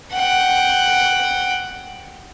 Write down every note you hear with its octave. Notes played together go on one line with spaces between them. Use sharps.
F#5 G5